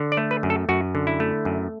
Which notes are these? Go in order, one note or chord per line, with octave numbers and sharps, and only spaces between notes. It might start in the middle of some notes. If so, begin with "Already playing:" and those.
Already playing: D3
D5
A3
B4
F#2
A4
F#2 F#4
D3
E4
A3
F#2